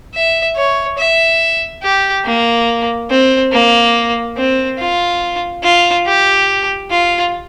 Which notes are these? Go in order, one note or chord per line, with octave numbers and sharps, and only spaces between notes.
E5
C#5
E5
G4
A#3
C4
A#3
C4
F4
F4
G4
F4